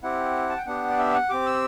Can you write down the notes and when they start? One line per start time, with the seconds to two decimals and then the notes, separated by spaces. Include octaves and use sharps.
0.03 C4 E4 G4 F#5
0.49 A5
0.57 G5
0.66 B3 D4 G4 F#5
0.89 D5
0.98 E5
1.14 F#5
1.29 C4 G4 D6
1.46 E6